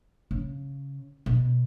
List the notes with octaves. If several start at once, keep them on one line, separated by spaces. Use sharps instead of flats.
C#3
B2